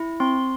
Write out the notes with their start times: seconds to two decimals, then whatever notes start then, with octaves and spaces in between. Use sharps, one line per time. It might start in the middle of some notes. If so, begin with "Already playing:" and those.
Already playing: E4
0.20 C4 C6